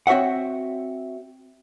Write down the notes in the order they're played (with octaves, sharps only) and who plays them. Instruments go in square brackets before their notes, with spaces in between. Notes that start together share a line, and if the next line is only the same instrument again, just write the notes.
[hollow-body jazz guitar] C4 F#4 C#5 E5 F#5